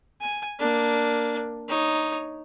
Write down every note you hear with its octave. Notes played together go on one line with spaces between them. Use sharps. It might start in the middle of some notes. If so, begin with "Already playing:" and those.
G#5
A#3 D4
D#4 C#5